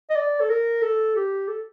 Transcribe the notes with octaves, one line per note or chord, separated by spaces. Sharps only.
D#5
D5
A4
A#4
A4
G4
A4